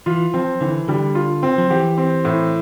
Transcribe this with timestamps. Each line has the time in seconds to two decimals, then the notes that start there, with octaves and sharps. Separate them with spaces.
0.06 E3 F4
0.34 F3 C4
0.61 D3 E3
0.88 D3 G3
1.15 F4
1.43 C4
1.58 F3
1.70 E3 G4
1.98 C4
2.25 A2